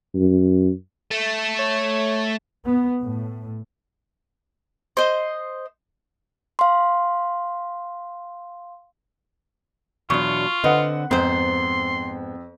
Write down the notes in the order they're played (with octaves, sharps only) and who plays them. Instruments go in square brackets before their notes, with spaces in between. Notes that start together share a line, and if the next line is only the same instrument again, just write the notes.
[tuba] F#2
[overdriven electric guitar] A3
[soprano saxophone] C#5
[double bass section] B3
A2
[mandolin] C5 D#5
[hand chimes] F5 C6
[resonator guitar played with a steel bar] E2 D4 [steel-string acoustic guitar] B2 F#3 [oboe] F4 [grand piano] C#6
[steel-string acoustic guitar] D3 C4 [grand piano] B4 F#5 [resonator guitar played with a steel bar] D#5
[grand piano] F2 [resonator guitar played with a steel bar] G#2 C5 [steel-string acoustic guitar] B3 [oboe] C6